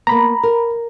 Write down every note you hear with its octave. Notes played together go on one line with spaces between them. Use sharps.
A#3 B3 A#5 B5
A#4